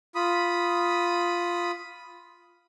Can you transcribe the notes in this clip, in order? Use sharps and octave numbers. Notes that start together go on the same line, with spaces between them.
F4 B5 D#6